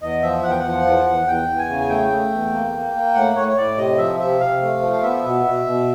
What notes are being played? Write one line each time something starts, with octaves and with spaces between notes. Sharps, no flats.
E2 D#5
F3 E5
E2 F#5
G5
F#5
F3
E2
E2
E2 G5
E2
G#5
C#3
G#5
A3 G5
A3
E2
A#3
A#3
A#3
A2 F#5
A2 C#5
C#5
A2 D5
C3 D#5
F3 E5
C3 E5
C3 F5
A3
F3
F5
B3 E5
B2
B2
B2